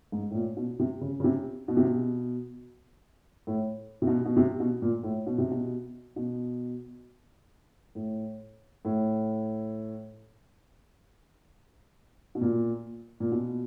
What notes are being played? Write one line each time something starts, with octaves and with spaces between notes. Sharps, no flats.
G#2
A2
A#2
B2
C3
C#3
C#3
C3
B2
C3
B2
A2
C3
B2
B2
C3
B2
A#2
A2
B2
C3
B2
B2
A2
A2
B2
A#2
A#2
B2